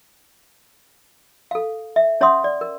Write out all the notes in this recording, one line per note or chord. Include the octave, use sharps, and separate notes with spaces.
A4 F5
E5
C#4 C#5 E5 F#5 C6 D#6
D5
A#4